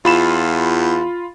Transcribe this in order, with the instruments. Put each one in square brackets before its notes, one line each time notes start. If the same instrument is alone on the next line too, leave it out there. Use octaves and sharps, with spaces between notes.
[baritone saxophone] E2 [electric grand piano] F4 B5 E7